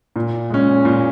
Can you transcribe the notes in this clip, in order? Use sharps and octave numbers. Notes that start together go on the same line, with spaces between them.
A#2
G#3 C#4
A#2